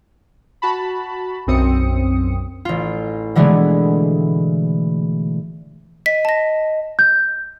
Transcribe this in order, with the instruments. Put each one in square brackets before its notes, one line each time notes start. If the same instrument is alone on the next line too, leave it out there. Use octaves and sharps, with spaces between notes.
[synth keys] F#4 A5 B5
B1 F#2 C4 D#6 C#7
[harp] A1 F4
B2 D3 E3 G#3 A3 B3
[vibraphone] D#5 [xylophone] B6
[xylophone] A5 A#6
[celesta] G6